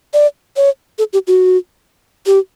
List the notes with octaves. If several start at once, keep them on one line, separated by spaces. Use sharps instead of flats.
D5
C#5
A4
G4
F#4
G4